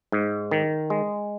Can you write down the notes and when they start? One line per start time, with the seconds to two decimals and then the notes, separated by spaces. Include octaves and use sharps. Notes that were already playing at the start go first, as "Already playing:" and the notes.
0.12 G#2
0.51 D#3
0.90 G#3